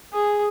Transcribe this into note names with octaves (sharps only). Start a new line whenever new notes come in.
G#4